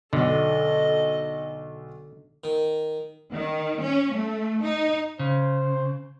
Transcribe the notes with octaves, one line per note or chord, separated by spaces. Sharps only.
B1 D3 A4 D#5
D#3
D#3
C#4
A3
D#4
C#3 C5